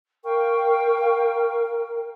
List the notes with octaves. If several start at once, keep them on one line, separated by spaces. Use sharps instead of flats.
A#4 F5 G5 C#6